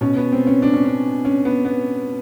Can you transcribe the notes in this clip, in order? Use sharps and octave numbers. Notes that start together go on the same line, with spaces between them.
B2 C#4
B3
C4
C#4
D4
C#4
D4
C#4
B3
B3